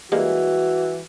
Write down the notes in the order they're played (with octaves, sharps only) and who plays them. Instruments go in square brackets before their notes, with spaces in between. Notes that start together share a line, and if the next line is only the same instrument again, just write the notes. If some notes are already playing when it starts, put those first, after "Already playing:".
[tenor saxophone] E3 [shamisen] G3 G#3 A#3 [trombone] F#4